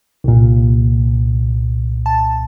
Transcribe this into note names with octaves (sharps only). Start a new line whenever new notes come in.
C2 A#2
A5